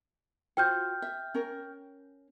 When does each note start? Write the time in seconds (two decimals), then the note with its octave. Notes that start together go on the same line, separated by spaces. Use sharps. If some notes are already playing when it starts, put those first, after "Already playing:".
0.57 F4 F#4 C5 G5 F6 G6
1.02 E5
1.34 C#4 A#4